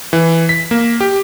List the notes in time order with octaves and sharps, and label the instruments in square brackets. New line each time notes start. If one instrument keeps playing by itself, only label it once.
[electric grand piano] E3
B6
A#3
G4